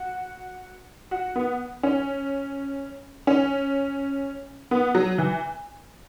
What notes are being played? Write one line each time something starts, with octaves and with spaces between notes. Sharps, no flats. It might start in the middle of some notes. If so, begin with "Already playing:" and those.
Already playing: F#4
F#4
B3
C#4
C#4
B3
F#3
E3